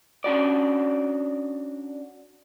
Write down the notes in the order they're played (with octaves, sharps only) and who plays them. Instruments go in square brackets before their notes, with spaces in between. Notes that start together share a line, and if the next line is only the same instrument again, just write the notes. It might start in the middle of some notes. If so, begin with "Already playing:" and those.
[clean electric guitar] C#4 D4 F#4 D5